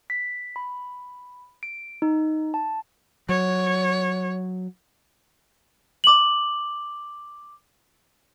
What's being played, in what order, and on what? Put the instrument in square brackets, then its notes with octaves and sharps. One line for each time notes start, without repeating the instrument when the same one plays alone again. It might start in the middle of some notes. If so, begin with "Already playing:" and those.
[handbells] B6
B5
D7
D#4
A5
[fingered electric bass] F#3 [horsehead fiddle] C#5
[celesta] D6 F#7